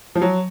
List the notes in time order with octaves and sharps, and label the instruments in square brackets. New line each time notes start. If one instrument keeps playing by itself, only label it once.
[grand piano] F3
F#3